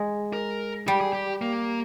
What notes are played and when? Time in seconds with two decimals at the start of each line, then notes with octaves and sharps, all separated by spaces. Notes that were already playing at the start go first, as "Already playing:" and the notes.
Already playing: G#3
0.33 A#4
0.88 G3 G4
1.01 G#4
1.13 G4
1.42 A#3